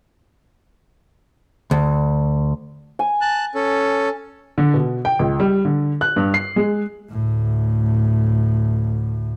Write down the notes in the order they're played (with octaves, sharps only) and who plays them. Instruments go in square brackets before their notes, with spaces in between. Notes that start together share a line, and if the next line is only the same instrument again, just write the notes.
[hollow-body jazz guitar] D2
[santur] G#5
[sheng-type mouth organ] A5 F#6
C#4 A4
[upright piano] D3
B2
G5
C#2
G3
D3
F#6
G2
C7
G#3
[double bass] D2 A2